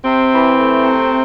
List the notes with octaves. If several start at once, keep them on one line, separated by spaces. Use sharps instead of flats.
C3 C4
E3
A3
C3